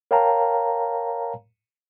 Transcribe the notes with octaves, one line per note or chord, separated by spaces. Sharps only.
A#4 C#5 F5 G5 A5 A#5